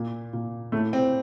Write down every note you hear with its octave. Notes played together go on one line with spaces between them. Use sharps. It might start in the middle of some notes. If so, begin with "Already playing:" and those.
Already playing: A#2
A#2
A2 A3
C4